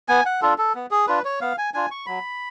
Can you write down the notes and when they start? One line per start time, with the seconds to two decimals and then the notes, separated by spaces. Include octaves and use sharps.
0.09 B3 G#5
0.26 F#5
0.41 D4 F4 A4
0.58 A4
0.75 B3
0.91 G#4
1.07 D4 F4 B4
1.25 C#5
1.41 B3 F5
1.58 G#5
1.74 D4 F4 G#5
1.91 C#6
2.06 F#3 B5